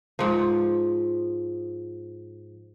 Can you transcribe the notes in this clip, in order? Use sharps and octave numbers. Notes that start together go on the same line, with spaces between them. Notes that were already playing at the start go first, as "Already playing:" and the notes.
G#2 F3